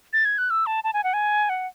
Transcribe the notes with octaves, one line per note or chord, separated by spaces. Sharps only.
A6
G#6
F#6
E6
A5
A5
G#5
F#5
G#5
F#5